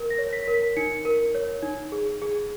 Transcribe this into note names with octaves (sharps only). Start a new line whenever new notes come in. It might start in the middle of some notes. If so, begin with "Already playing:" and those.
Already playing: A#4
A#6
C#5
B6
A#4
B6
D#4 C#7
A#4
C#5
D#4
G#4
G#4